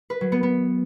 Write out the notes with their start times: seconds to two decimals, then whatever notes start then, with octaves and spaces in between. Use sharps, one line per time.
0.10 B4
0.21 F#3
0.32 B3
0.43 B3